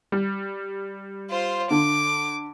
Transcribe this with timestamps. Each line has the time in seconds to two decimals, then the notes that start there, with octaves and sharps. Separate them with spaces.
0.12 G3
1.31 F4 C5
1.71 D3 D6